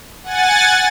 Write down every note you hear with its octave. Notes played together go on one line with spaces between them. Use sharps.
F#5 G#5 A6